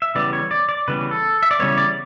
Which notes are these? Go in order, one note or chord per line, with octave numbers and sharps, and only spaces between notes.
E5
C#3 E3 G3 B3 D5
C#5
D5
D5
C#3 E3 G3 B3 B4
A4
E5
D5
C#3 E3 G3 B3 C#5
D5